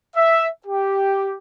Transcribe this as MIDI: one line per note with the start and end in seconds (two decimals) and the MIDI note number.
0.16 0.47 76
0.67 1.35 67